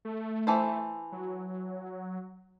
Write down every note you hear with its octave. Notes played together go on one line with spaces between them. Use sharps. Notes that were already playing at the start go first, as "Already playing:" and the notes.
A3
E3 A4 C5
F#3